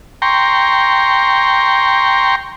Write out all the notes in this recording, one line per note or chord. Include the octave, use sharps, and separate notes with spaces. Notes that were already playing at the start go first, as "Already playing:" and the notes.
G5 A#5 C6 C#6